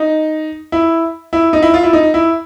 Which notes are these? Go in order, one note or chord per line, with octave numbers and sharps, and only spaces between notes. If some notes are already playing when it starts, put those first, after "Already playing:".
Already playing: D#4
E4
E4
D#4
E4
F4
E4
D#4
E4